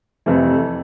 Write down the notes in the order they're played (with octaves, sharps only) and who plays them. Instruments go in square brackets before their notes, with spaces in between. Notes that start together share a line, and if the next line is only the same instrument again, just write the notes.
[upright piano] F2 C3 E3 A3